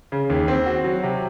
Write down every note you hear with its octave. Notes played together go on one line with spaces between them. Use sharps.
C#3
D#2
C4
F#4
F#3
C3